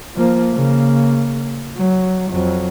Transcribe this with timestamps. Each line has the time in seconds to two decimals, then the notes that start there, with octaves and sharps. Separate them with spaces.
0.16 F3 A#3
0.53 C#3 A#3
1.77 F#3
2.30 F2 F#3